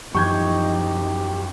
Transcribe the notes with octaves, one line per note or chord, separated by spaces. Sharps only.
F#2 E3 F3 D#4 G4 C#6 G6 G#6